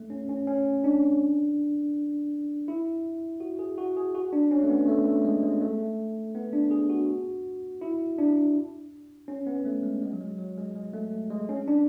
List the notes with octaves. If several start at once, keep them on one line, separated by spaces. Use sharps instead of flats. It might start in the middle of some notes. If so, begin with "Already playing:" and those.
Already playing: A3
C#4
C#4
C#4
D4
E4
F#4
G#4
F#4
G#4
F#4
D4
C#4
A3
B3
A3
A3
G#3
G#3
A3
B3
D4
G#4
F#4
E4
D4
C#4
B3
A3
G#3
G#3
F#3
G#3
F#3
G#3
G#3
A3
G#3
C#4
D4